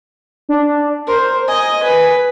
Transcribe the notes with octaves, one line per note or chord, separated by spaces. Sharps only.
D4
A#4 C5
D#5 G#5
B4